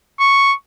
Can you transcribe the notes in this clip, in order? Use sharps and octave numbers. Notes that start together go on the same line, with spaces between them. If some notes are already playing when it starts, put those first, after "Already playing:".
C#6